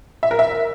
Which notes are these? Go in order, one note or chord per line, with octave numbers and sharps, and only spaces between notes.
E5
A#4
E5